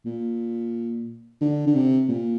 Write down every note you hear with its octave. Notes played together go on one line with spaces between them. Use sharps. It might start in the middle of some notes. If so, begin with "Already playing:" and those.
A#2
D3
D3
C3
A#2